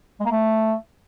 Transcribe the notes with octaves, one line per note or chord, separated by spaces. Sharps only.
G#3
A#3
A3